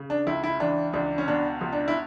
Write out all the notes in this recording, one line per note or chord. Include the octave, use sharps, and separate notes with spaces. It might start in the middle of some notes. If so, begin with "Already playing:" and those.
Already playing: C#3
D4
C#2 E4
E4
E3 D4
C#2 D4
C#4
B2 D4
C#2
D4
E4